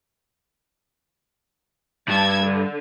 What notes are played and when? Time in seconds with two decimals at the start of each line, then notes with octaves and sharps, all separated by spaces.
2.08 G2 A5 E6 G#6
2.42 D3